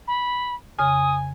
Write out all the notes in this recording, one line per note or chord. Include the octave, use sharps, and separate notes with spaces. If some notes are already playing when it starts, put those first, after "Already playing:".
B5
F2 C#3 G#5 D#6 F6